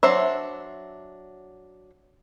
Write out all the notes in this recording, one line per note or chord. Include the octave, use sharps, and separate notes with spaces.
F#3 D4 C5 E5